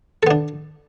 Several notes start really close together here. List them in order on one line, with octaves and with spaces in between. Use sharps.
A4 B3 D4